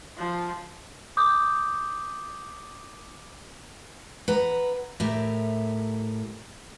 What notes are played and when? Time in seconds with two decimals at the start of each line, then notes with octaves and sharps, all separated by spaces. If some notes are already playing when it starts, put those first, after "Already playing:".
0.17 F3
1.17 D6 D#6 G6
4.28 B4 F#5 A#5
5.00 A2 G4 A#4 E5